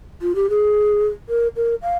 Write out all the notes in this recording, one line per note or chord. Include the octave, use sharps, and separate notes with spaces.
F4
G4
G#4
A#4
A#4
F5